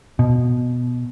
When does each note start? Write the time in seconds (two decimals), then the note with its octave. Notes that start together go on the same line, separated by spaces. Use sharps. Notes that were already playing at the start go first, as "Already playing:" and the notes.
0.19 B2